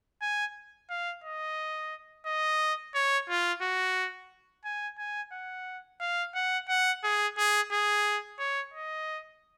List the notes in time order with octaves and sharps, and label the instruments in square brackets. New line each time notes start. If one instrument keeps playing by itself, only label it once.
[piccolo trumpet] G#5
F5
D#5
D#5
C#5
F4
F#4
G#5
G#5
F#5
F5
F#5
F#5
G#4
G#4
G#4
C#5
D#5